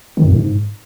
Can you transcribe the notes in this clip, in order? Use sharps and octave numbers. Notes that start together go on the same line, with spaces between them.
D#3
F2
A2
G#2